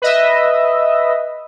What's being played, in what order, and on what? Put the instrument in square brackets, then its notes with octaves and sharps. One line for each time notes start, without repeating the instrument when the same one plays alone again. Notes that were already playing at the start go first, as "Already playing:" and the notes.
[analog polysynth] B4 D#5 E5